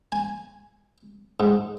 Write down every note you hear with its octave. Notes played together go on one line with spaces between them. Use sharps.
G#5
G#2